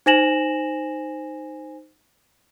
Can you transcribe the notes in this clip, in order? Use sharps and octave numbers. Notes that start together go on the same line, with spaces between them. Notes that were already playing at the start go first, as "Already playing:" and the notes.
D#4 C5 G#5 A#6 E7 F#7